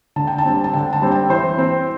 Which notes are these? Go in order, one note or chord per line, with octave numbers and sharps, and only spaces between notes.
D3 A5
G5
A5
G3 C4
A5
D3 G5
A5
G3 C4
G5
E3 C5
C4